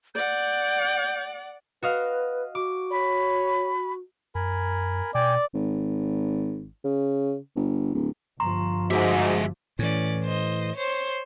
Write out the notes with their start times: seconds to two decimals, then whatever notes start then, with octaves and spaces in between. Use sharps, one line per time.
0.15 D5 F#5 G6
1.83 F#4 B4 D#5 F5
2.55 F#4 D6
2.91 C#5 B5
4.35 F#2 A#4 G#5 B5
5.15 B2 D5 G5 G#5 D6
5.54 G#1
6.84 C#3
7.56 G1
7.94 D1
8.40 G1 F3 A#5 C6 C#6
8.91 G#2 G#3 F#4 E5 D6
9.79 A2 E3 C#4 D5
10.24 C5 D#5
10.76 C5 C#5